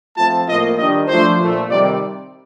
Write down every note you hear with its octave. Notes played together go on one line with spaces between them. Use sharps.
F3 A3 C4 F4 A5
A2 F3 A#3 F4 D#5
D#3 G3 D4 D#5
F3 A3 D4 F4 C5
A#2 F3 A3
C3 D#3 G3 D5